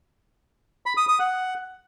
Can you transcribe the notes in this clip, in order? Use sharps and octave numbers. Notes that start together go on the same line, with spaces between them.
B5
D#6
D#6
F#5